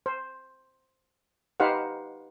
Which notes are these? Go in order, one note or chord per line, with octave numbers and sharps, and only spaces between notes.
C5
D#4 G4 B4 C5 F5 F#5